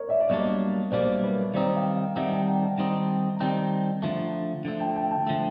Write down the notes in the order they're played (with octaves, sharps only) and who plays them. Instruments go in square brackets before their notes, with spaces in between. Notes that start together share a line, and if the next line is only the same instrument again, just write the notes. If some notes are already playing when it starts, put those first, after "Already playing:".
Already playing: [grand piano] A#4 C#5 D#5
D5 E5
D5
[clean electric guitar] B1 B2 G3 A#3 D4 [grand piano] C#5 D#5
[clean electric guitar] B1 B2 G3 A#3 D4 [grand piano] C5 D5
[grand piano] B4 C#5
[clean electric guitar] D#3 G3 C4 D#4 [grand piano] C5 D5
[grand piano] F5 G5
F5 G5
[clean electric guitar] D#3 G3 C4 D#4 [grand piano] E5 F#5
[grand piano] G5 A5
A#5
G5 A5
G5 A5
[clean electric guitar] D#3 G3 C4 D#4
[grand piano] A#5
[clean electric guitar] D#3 G3 C4 D#4 [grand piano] G5 A5
[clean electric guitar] D3 F3 A3
D3 F3 A3
[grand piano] G5 A5
G5 A5
G5 A5
[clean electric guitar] D3 F3 A3